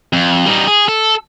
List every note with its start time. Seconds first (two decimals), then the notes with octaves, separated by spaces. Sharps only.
0.13 F2
0.46 G3 D#4
0.67 G#4
0.88 A4